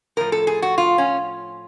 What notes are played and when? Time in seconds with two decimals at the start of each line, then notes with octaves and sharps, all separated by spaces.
0.17 A2 F3 A#4
0.32 A4
0.47 G#4
0.62 F#4
0.78 F4
0.98 C#4